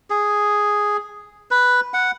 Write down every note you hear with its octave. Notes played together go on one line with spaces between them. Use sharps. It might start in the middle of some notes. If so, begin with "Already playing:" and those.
G#4
B4
F#5